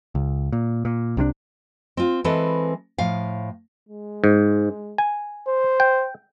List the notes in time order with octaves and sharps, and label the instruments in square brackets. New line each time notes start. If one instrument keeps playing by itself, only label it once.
[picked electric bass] C#2
A#2
A#2
C2 C3 E3 D4
[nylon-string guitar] C4 F4
E3 G#3 C4 A4 B4
A2 F3 F5
[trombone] G#3
[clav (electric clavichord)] G#2
G#5
[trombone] C5
[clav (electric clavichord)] G5